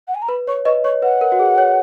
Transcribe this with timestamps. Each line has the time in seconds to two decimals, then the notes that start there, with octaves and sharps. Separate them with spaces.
0.07 F#5
0.14 G#5
0.22 A#5
0.28 B4 B5
0.47 C#5 C#6
0.65 B4 D#5 C#6
0.84 C#5 C#6
1.02 B4 F#5
1.21 A#4
1.32 F#4
1.39 G#4
1.58 C#5